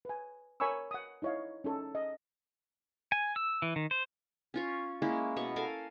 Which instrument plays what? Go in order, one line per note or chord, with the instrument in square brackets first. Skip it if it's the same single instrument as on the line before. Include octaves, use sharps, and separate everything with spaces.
[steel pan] B4 G#5
A#4 C#5 G#5 B5 C#6 E6
F#5 D#6
D#4 E4 C#5 D#5 F5
C#4 D#4 A4
D#5
[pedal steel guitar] G#5
E6
E3
D#3
C5
[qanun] C#4 F4 C#5
G#3 A#3 C#4 E4
B2 B3 C#5 C#6
A4 A#4 F5 G#5